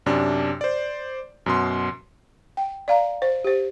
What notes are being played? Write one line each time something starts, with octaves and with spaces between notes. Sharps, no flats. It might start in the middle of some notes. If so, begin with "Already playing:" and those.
F#2 C3 D4
C5 D5
F#2 B2 C6
G5
D5 F5 A#5
C5
G4 C5